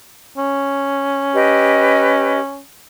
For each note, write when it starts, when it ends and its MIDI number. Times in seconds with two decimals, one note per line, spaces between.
0.38 2.60 61
1.34 2.39 67
1.34 2.39 71
1.34 2.39 75